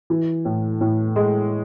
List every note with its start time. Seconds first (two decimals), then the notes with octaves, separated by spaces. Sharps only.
0.10 E3
0.45 A2
0.81 A2
1.16 G#3